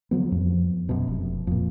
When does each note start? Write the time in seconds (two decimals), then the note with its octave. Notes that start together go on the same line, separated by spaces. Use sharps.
0.11 C#3 F3 F#3 B3
0.32 F2
0.89 F#2 B2
1.08 F1
1.47 F2 A#2